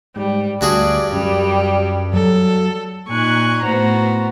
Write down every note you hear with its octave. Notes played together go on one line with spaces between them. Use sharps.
G#2 G3
D2 G2 F#4 G#4 D5
F#2 G3
F#3 A4
A#2 D#4 G#5 C#6 F#6
A2 B3 F#4 C5 A#5